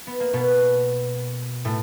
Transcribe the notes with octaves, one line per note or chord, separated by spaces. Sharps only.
B3
A#3
B2 B3
A2 A3